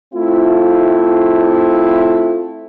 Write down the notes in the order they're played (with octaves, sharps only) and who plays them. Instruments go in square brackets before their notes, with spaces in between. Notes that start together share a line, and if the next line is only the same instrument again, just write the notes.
[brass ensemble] A3 C4 E4 F4